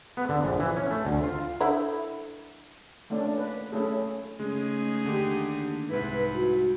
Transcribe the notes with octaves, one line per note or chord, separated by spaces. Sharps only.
B3
D3
A#1
E3
C#4
A3
D2
F4
D3 D#4 E4
A3 A#3 C#4 D4 D5
B4
A3 C#4 E4 G#4 A4
C#3 G#3 A3 D#4 G#4
D#2 D3 D4 G4
C2 G#2 E4 B4 B5
F#4